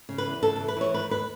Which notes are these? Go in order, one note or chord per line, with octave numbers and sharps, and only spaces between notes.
C#3
B4
E2
C#3 A4
E3 A4
B4
E3 C#5
D#3 B4
D#2 B4